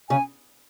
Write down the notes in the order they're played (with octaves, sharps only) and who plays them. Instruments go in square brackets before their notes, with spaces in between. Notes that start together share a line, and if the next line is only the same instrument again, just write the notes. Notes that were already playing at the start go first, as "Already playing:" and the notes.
[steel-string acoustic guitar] C#3 [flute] G#5